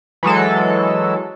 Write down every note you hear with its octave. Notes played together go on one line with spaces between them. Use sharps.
E3 F#3 G#3 A4